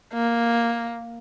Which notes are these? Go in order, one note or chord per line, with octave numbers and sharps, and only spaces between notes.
A#3